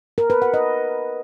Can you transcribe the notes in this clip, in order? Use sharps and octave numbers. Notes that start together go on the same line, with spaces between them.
A#4
B4
F#5
D#5